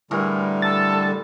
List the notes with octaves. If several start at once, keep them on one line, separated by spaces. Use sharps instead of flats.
A2 D3 E3 G3 A#4
A4 A6